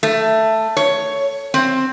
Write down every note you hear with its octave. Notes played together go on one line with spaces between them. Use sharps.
A3
C#5
C4